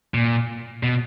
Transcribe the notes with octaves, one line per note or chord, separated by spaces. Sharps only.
A#2
B2